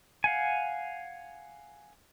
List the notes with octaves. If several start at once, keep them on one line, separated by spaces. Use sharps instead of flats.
F5 F#5 G#5